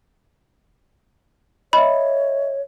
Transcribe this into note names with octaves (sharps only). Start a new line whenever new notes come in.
C#5 D#5 E5 B5